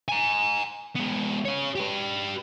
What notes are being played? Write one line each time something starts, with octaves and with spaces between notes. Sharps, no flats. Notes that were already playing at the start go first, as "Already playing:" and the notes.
G#5 A#5
G#3 B3
G#4 C#5
G4 B4